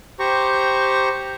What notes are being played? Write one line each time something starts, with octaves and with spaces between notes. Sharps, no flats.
G4 C5 A#5 C#6